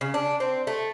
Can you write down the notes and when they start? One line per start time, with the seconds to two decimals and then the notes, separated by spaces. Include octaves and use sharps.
0.01 C#3
0.14 D4
0.40 C4
0.67 A3